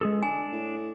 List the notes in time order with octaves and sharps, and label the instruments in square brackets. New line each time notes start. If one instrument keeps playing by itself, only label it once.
[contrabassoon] C#2 [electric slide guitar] G#3 G#4 A4
[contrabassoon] D3 [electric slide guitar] D4 [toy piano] G#5
[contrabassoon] A2